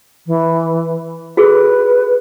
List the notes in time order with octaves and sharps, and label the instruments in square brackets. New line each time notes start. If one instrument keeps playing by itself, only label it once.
[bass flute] E3
[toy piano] F#4 G#4 A4 [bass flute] B4